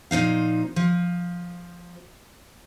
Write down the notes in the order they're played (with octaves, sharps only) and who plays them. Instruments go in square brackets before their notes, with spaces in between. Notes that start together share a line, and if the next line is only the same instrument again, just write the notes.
[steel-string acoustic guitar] A#2 F3 D#4 F5
F3